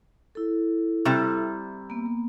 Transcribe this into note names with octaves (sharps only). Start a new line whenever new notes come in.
E4 A4
C3 G3
A#3 B3